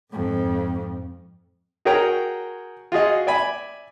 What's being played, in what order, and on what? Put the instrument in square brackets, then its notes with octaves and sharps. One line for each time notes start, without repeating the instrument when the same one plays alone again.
[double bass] F2 G#2
[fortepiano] F#4 G#4 A#4 C#5 G5 A#5
F4 F#4 G#4 D#5
D5 E5 G#5 B5